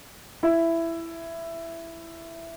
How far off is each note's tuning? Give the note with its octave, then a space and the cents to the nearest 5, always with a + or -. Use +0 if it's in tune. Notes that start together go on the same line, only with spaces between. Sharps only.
E4 +10